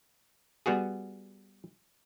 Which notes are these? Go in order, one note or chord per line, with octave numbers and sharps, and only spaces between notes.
G3 B3 F#4 G#4